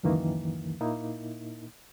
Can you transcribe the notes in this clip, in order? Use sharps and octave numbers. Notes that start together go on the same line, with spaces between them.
C#2 F#2 D#3 E3 A#3
A#2 A#3 D#4 E4